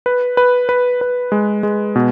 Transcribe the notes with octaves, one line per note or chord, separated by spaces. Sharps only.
B4
B4
B4
B4
G#3
G#3
B2